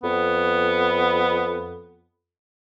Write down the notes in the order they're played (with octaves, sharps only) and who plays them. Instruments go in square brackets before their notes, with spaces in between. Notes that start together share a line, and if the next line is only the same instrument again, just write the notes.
[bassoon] F2 [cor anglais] B3